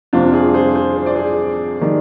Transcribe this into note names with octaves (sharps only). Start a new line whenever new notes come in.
F2 C3 G3 D4 F4
F4 G#4
G#4 C5
G#4 C5
C5
D5
G#4 C5
D#3 G3